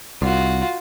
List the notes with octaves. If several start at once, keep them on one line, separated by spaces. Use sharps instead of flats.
C2 F4 F#4